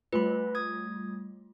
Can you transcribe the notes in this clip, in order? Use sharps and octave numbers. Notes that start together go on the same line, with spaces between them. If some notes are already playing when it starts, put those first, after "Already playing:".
G3 A3 F4 B4 B5
D#6 G#6